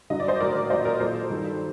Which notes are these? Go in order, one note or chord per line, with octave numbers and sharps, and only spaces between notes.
G2 D3 F#3 D#5
D5
C5 D#5
A2 F#3 A#4 D5
A#2 F#3 C5 D#5
A#4 D5
A#2 F#3 A4 C5
G2 D#3 F#3